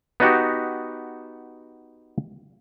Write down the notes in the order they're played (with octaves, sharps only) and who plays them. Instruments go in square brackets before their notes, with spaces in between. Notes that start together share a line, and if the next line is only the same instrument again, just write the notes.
[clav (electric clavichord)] B3 D#4 F#4 G4